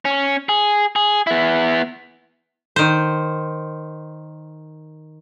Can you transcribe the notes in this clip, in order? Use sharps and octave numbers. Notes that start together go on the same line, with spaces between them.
C#4
G#4
G#4
B3 E4
D#3 C5